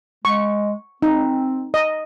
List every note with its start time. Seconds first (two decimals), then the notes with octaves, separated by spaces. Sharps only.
0.25 G#3 C#6
1.02 C4 D#4
1.74 D#5